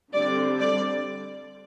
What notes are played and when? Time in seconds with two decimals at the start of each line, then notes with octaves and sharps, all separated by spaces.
0.14 D3 G3 C4 D5
0.60 D5